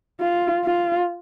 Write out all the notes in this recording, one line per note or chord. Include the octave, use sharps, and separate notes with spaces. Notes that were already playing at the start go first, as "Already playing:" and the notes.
F4
F4